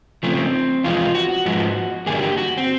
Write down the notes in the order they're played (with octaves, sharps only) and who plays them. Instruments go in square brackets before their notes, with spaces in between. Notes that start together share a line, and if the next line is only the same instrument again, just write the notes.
[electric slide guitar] C#3 F3 A3 C4
E2 C3 F3 G#3 B3 F4
F#4
G#2 F3 G#3 B3
G2 D3 G3 A#3 G#4
G4
F#4
C4